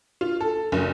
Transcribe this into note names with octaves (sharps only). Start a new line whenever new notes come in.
F4
A4
F#1